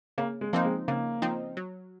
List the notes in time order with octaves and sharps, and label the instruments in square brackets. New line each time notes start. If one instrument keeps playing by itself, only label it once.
[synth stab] C#3 [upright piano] A#3
[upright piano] G#3
[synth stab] F3 C4 D#4 [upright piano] A#3
[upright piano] G#3
[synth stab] C#3 [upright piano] A#3
[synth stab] F3 C4 D#4
F#3